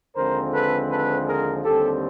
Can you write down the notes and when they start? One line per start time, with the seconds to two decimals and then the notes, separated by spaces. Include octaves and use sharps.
0.16 D#2 D3 F3 G#3 C4 A#4 C5
0.53 A4 B4
0.90 A4 B4
1.27 G#4 A#4
1.64 D#2 D3 G3 C4 G4 A4